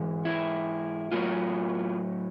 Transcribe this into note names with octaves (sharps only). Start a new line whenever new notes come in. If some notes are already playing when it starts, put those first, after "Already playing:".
Already playing: G#2 E3 G#3
E4
A2 F#3 A3 F4